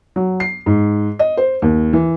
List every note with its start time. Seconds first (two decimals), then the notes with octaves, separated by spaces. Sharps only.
0.16 F#3
0.40 C7
0.66 G#2
1.19 D#5
1.37 C5
1.62 D#2
1.93 E3